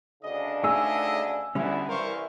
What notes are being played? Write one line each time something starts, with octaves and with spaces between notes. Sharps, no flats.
D2 C#3 D4 D#5
A3 D#4 G#4 D#5 E5 G#5 E6
D2 D3 G3 G#3 B3 C#4 E4
C2 E3 E4 A#4 C5 F5 C#6